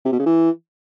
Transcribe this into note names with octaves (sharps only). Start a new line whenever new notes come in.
C3
B2
C#3
E3